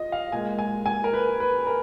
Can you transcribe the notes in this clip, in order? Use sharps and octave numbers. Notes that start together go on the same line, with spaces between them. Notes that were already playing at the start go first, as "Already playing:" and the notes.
Already playing: F4 D#5
F5
A#2 G#3 G#5
G#5
G#5
A#4
B4
B4
A#4